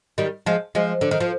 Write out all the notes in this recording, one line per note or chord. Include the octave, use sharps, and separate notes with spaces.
D#3 G3
F3 G#3
F3 G#3
D3
D#3
F3